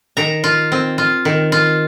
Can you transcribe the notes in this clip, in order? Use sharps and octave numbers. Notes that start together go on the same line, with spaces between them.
D#3 A#5
F4
C4
F4
D#3
F4